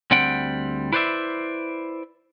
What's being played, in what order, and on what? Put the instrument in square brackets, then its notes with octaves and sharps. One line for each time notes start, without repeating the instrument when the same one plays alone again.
[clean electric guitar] D2 G3 C4 F#5 G5
E4 B4 C5 D5 E5